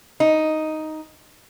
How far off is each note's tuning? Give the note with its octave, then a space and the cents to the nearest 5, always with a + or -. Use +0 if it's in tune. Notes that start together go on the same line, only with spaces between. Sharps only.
D#4 +5